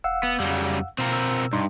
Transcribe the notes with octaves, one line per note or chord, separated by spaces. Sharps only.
E1 F5 F#5 E6
B3
F2 C#3 F#3 G3
B2 C4 F4 A#4
E6
G2 D#4 C6